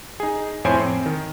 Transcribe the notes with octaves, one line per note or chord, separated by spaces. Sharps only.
D#4 G#4
F2 A2 C5 C#5 G#5 D7
C4
D#3